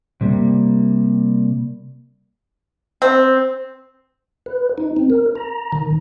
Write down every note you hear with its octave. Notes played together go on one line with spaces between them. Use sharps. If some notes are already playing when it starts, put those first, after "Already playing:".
C3 G3 A#3
C4
B4
D#4
C4
A#4
A#5
D#3